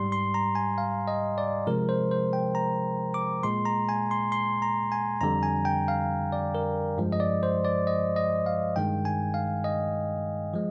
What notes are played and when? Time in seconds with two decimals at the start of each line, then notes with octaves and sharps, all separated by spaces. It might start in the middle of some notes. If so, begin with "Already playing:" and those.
Already playing: G#2 G3 C6
0.12 C6
0.34 A#5
0.55 G#5
0.78 F5
1.08 D#5
1.38 D5
1.67 C3 F3 G#3 A#4
1.89 C5
2.11 C5
2.33 G5
2.55 A#5
3.14 D6
3.43 A#2 G#3 C6
3.65 A#5
3.89 G#5
4.11 C6
4.32 C6
4.62 A#5
4.92 G#5
5.21 F2 D3 G3 A#5
5.43 G#5
5.65 G5
5.88 F5
6.32 D5
6.55 A#4
6.98 G2 F3 G#3
7.12 D#5
7.20 D5
7.43 C5
7.65 D5
7.87 D#5
8.16 D#5
8.46 F5
8.76 G2 D#3 G#3 G5
9.05 G#5
9.34 F5
9.64 D#5
10.54 F3 G#3